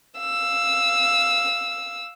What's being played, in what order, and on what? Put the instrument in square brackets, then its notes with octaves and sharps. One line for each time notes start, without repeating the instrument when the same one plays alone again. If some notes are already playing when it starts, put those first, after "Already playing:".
[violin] F5 E6